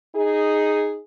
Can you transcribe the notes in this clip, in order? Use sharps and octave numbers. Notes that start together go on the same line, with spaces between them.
D#4 G#4